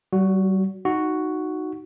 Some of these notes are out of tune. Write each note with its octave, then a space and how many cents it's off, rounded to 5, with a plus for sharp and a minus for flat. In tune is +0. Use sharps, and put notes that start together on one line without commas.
G3 -40 F#4 +0
D#4 -5 F#4 +0